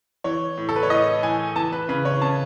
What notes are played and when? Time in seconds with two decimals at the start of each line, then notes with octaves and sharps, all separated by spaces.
0.24 E3 C#5
0.58 A2
0.69 A4
0.76 B4
0.83 C#5
0.90 A2 D#5
1.23 E3 G#5
1.56 E3 A5
1.72 B4
1.89 C#3 B4
2.05 C#5
2.21 C#3 A5